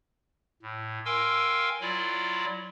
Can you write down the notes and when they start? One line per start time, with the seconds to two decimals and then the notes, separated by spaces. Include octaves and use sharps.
0.62 A2
1.05 A#4 F5 G5 G#5 C6 E6
1.81 F#3 E4 F4 D5